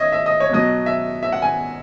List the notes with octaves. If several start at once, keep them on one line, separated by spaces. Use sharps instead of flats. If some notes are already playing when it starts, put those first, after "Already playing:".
Already playing: C#5 D#5 E5
E5
D#5
C#5
B2 F#3 D#5
E5
E5
F#5
G#5